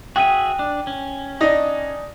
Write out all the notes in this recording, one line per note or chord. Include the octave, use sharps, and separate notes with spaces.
F#4 G#4 E5 G5 D#7
D4
C#4
D4 D#4 D#5